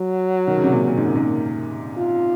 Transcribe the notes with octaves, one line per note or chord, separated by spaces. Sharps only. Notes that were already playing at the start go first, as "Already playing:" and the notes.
Already playing: F#3
D#3
C#3
C3
A#2
A#2
G#2
F#2
G#2
A#2
F4